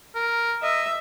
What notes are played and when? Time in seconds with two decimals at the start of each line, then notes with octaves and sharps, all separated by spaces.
0.15 A#4
0.63 D#5 E5